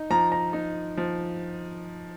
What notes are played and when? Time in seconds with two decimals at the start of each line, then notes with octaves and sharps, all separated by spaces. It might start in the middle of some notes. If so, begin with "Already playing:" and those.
Already playing: D#4
0.10 F3 A#5
0.32 A#5
0.53 D#4
0.97 F3